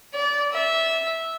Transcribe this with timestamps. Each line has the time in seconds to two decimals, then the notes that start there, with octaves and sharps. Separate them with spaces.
0.14 D5
0.53 E5